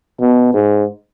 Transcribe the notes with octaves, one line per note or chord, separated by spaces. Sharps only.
B2
G#2